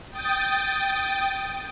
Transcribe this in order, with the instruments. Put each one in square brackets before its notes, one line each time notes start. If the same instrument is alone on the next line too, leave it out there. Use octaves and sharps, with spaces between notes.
[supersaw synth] G5 D#6 A6